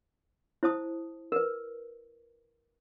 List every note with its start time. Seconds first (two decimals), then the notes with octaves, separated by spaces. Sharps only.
0.63 E4 C5 A5 D#6
1.32 A#4 B4